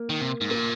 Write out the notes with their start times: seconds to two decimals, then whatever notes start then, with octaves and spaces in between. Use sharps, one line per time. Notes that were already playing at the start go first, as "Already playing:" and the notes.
Already playing: A#3
0.10 D#3
0.20 C3
0.41 G#2
0.50 A#2 A#3